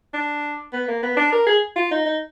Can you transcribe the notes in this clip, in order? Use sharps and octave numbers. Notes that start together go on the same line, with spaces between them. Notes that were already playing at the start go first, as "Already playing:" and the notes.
D4
B3
A#3
B3
D4
A#4
G#4
F4
D#4
D#4